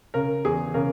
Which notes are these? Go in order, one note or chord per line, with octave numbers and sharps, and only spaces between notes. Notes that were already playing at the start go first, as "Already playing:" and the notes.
C#3 A#4
E2 G#4
C#3 A#4